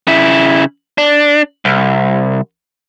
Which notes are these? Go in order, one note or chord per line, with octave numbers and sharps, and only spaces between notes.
C#3 E4
D4
C2